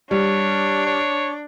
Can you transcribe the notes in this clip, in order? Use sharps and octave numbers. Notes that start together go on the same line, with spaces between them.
G3 D4 C#5
C#5